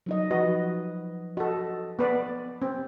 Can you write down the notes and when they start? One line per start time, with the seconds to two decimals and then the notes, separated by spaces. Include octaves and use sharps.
0.06 F#3 D#4 D#5
0.31 F3 F#4 B4 D#5
1.37 F#4 A4 D#5
1.99 B3 B4 D5
2.62 C4